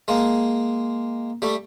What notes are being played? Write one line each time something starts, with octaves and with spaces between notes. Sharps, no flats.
G#3 A#3
G3 A3